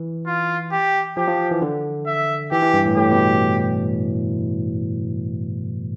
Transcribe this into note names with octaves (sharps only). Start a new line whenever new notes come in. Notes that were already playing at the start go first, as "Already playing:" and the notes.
Already playing: E3
F4
G4
F3 G4
F3
E3
D3
E5
E3 G4
E3
G2
A2
A2 G4
B2